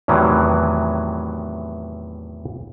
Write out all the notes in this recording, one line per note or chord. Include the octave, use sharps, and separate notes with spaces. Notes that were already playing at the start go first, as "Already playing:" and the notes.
E2 A2 C3 D#3 E3 F#3